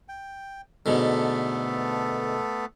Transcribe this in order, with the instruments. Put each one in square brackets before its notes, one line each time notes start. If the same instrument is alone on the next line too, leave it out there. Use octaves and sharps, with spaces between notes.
[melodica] G5
[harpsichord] G#2 B2 D3 [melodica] A3 B3 A4